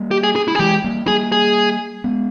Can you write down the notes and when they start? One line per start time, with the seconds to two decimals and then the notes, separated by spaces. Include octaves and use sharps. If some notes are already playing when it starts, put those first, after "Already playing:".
Already playing: G3 A#3
0.11 G4
0.23 G#4
0.36 G#4
0.48 E4
0.55 G#4
0.59 E3 G#3 G4
0.84 G3 A#3
1.07 G3 A#3 G#4
1.32 G#4
2.04 G#3 B3